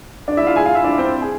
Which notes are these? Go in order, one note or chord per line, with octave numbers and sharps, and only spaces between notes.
D4 D5
E4 E5
F4 F5
G#4 G#5
F4 F5
E4 E5
D4 D5
C4 C5
G#4